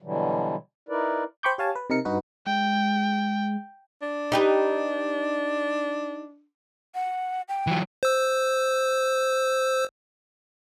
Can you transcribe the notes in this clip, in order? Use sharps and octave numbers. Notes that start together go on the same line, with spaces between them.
B2 D3 E3 F#3 G3
D#4 E4 A#4 B4 D5
C5 G5 B5 C#6 D6 G6
G4 C#5 F5 G#5 A5
B4
C3 D#4 A#4 C#7
G2 D#4 F#4 B4
G#3 G5
D4
D#4 G4 B4
F#5
G5
E3 F#3
C5 E6